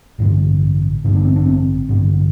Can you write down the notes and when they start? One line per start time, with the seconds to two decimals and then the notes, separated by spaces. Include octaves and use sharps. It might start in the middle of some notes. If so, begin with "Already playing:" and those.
0.19 A1 G2 D3
1.04 A1 G2 D3
1.15 D4
1.25 C4
1.36 D4
1.46 C4
1.89 A1 G2 D3